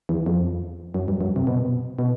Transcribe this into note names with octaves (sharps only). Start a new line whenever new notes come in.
E2
F2
F#2
G2
F#2
C3
B2
B2